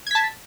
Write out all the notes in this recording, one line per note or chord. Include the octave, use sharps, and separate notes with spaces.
A5 G#6 B6